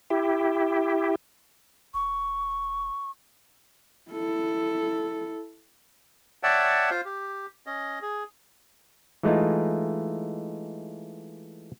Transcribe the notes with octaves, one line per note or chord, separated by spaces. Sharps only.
E4 G4
E1 C#6
E4 A4
C#5 D5 E5 F#5 G5 A5
F4 C5
G4
C#4 D#5
G#4
E3 G#3 A3 D#4 F4